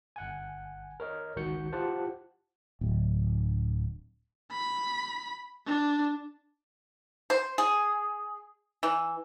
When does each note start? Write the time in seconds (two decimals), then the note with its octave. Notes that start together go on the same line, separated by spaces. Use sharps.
0.16 G1 F#5 G#5
1.00 A#4 C#5 D#5
1.36 G#1 C#2 D#3 F#4 G6 C#7
1.73 E4 F4 G4 C5 F#5 A5
2.81 D1
4.52 B5
5.66 D4
7.30 C5
7.58 G#4
8.83 E3